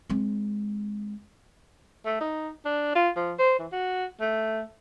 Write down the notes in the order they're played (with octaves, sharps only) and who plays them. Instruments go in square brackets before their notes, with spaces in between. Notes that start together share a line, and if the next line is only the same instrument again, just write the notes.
[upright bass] G#3 C4
[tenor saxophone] A3
D#4
D4
F4
F3
C5
E3
F#4
A3